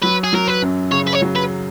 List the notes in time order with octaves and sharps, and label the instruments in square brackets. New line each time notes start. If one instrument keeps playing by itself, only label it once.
[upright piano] F#3 [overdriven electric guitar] B4
[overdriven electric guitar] G#4
[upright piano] F#3 [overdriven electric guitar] A#4
[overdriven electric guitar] B4
[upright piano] F#2
[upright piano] C#3 [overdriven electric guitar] C#5
[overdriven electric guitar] B4
C#5
[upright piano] F#3
[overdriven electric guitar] B4